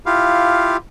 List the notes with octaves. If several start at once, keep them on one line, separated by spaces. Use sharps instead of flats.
E4 F4 G4 F5